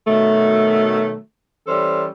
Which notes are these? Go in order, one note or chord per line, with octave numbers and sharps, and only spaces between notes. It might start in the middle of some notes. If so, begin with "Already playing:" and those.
B2 D#3 F#3 A3
E3 G3 C#4 A4 C5